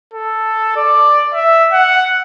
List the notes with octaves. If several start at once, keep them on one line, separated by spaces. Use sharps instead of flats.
A4
D5
E5
F#5